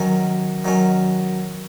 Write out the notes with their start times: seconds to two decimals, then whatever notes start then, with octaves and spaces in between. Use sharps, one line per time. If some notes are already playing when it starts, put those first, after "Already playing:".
Already playing: D#3 F#3 C#4
0.65 D#3 F#3 C#4